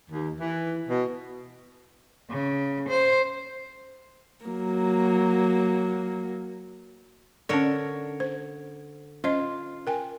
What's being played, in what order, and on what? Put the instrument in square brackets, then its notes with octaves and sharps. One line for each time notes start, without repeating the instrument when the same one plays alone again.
[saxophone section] D#2
E3
B2
[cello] C#3
C5
[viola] F#3 A#3
[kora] D3 A#4 C#5 [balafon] C#4 D5
[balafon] C5
[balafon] C#4 C5 D#5 [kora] F4
[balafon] A#4 G5 G#5